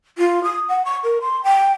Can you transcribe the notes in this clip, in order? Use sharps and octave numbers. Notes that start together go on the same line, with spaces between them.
F4
D#6
F#5
C#6
A#4
C6
G5